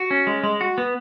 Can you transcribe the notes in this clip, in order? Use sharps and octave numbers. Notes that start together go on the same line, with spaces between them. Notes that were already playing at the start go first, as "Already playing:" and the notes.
Already playing: F#4
C#4
G#3
G#3
F#4
B3